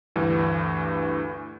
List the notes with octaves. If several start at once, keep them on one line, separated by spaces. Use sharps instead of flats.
D2 G2 E3